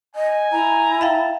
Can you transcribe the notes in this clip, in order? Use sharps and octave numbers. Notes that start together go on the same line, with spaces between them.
D#5 G#5
E4 A#5
E5 F5 G5 A5